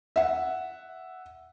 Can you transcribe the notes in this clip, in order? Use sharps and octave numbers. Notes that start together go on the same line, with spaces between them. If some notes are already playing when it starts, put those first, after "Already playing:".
E5 F#5